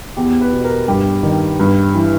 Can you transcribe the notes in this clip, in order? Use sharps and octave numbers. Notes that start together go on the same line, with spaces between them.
E2 G4
B4
B2
A#4
G2 G4
D#3
G2
E3